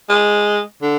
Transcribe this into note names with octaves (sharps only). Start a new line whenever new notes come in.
G#3
D3